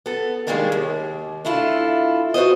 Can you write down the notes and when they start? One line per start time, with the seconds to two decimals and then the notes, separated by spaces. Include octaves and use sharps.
0.06 B3 A4
0.47 D#3 G3 G#3 A#3 D4 A#4
0.72 D#2
1.45 A3 D4 E4 F4 A4
2.34 F#4 B4 C5 D#5